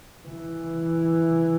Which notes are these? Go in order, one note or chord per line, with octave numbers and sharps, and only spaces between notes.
E3